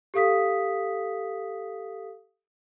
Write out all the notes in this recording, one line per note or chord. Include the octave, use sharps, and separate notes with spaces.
G4 A4 F5 D#6 B6